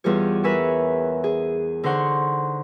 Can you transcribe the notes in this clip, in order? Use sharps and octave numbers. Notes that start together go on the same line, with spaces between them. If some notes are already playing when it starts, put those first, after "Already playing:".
E2 G3 F4 G#4 C#5
A#4 B4 C#5 E5 G#5 C#6
G#4
D3 D#4 C5 F#5 C6 C#6